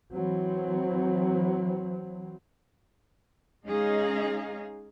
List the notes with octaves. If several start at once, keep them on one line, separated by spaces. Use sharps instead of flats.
E3 F#3 C4
G#3 C#4 D#4 G#4 D#5 F5